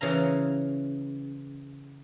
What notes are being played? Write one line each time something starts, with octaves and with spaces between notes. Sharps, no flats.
C#3 E3 F5 A#5